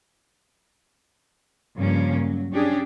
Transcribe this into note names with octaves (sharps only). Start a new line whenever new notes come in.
G2 C#3 F3 A#3 C#4
F#3
C#4 D4 G4 G#4